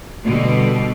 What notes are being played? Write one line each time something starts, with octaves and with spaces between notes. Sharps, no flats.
B2 D3 G3